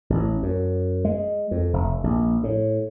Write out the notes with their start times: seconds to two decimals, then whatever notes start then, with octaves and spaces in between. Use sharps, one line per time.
0.10 A1
0.43 F#2
1.05 G#3
1.51 F2
1.73 F1
2.04 A#1
2.44 A2